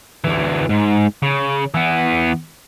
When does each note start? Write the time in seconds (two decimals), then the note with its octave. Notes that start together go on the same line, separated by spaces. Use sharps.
0.24 D2 E3
0.69 G#2
1.23 C#3
1.75 E3 B3